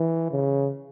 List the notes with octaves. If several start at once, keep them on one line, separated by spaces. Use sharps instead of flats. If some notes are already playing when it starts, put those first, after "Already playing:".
Already playing: E3
C#3